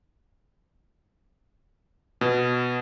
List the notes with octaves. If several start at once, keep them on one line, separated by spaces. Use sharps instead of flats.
B2